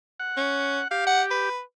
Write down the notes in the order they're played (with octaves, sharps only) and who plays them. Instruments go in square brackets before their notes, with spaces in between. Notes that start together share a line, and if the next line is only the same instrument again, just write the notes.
[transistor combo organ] F#5
[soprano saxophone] C#4
[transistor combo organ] G4 [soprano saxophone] F5
[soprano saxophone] F#5
B4